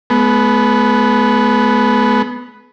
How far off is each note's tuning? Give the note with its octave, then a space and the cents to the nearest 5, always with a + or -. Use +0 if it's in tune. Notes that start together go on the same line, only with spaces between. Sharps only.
G#3 +45 B3 +0